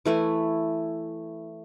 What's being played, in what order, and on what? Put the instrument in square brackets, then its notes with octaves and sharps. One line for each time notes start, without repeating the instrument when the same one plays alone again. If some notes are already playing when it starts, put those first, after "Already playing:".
[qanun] E3 A3 E4 B4